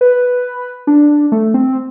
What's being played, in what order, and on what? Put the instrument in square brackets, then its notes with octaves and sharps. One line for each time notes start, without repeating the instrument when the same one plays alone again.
[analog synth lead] B4
D4
A3
C4